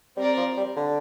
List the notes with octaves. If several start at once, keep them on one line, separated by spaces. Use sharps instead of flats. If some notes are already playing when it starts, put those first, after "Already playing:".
G3 C4 A#4 D5
F3
G3
D3